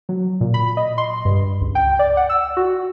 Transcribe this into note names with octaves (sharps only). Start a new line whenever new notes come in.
F#3
A#2
B5
D#5
C6
G2
C#2
G5
D5
F#5
E6
F#4